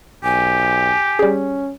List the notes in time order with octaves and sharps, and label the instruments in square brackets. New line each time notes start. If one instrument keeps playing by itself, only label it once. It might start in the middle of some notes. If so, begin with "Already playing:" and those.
[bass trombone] B1 [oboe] G4 [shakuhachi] G#5
[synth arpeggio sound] G3 G#4 [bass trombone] C#4